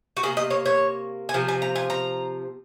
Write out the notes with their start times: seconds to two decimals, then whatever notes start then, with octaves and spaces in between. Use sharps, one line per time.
0.17 F#4
0.23 C3 F#3 A#3 G#4
0.37 D#5
0.50 C#5
0.66 C#5
1.29 G#5
1.34 C3 F3
1.48 G#5
1.62 A#5
1.76 G#5
1.90 A#5